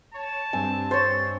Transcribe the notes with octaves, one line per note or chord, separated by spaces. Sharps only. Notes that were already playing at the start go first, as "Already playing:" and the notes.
C#5 A5
G2 C4 G#5
C5 C#5 A6